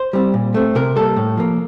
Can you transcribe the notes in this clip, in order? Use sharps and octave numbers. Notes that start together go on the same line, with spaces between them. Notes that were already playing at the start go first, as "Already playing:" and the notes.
Already playing: C5
G3 C4
A#2
A3 C4
C3 A#4
G3 A#3 A4
A2
F3 A#3